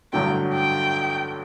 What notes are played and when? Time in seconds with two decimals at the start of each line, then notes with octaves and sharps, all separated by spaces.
0.13 A1 G2 D3 F#3 A3 G5
0.54 G5